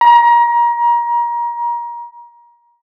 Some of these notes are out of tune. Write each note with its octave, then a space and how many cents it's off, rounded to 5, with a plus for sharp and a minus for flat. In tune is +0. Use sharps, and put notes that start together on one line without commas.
A#5 +30